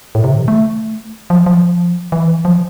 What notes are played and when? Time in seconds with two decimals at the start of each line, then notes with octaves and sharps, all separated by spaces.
0.15 A2
0.24 C3
0.31 D3
0.39 E3
0.48 A3
1.30 F3
1.46 F3
2.12 E3
2.45 F3